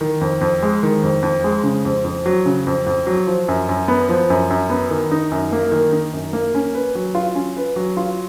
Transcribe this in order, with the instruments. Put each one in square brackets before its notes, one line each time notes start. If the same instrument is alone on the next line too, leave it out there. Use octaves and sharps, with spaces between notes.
[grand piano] D#3
F2
F2
G#3
D#3
F2
F2
G#3
C#3
F2
F2
F#3
C#3
F2
F2
F#3
F3
F#2
F#2
B3
F3
F#2
F#2
B3
D#3
D#4
F#2
A#3
D#3
D#4
F#2
A#3
C#4
B4
F#3
F4
C#4
B4
F#3
F4